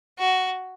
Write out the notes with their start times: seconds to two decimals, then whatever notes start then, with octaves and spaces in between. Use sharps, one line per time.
0.19 F#4